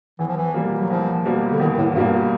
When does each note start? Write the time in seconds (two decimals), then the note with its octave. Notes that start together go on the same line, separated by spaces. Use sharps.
0.19 E2 E3
0.28 F3
0.36 E3
0.54 B2 G3 A#3
0.80 F#3
0.90 E2 F3
1.25 B2 G3 A#3
1.51 D3
1.60 E2 D#3
1.78 A2
1.95 G2 B2 G3 A#3